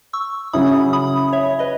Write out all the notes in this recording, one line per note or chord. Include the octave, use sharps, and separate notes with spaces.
C#6 E6
C#3 F#3 C#4 E4 B5 D#6
B5 D#6
C#5 E5
B4 D#5